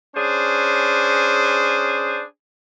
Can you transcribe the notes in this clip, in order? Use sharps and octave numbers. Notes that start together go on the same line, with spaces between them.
C#4 D4 G#4 C5